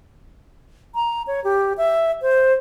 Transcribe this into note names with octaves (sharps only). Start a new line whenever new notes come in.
A#5
C#5
G4
E5
C5